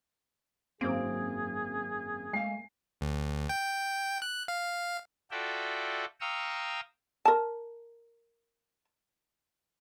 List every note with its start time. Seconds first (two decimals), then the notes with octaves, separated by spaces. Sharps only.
0.81 G#1 F#2 A#3 C4 G#4 C5 D7
2.33 G#3 A3 F5 G#5 C7
3.01 D2
3.49 G5
4.22 F#6
4.48 F5
5.31 F4 F#4 A4 D5 E5 G5
6.21 F5 G5 A#5 C#6 D#6 E6
7.25 A#4 A5